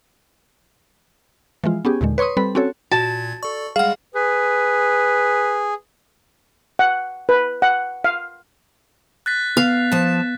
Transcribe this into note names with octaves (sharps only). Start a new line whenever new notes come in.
E3 F3 G#3 F4
B3 C#4 G4 G#4
D#2 A#2 D3 G#3
B4 C#5 C6 C#6 D#6
G3 C4 A4 B4 B5
C4 C#4 F#4 A4 C#5
A#2 F#4 A5 G#6
A4 D5 C#6
G3 G#3 G#4 F5 F#5 F6
G#4 B4
F#5
B4
F#5
F5
F#6 A6 B6
B3 F5
F3 A5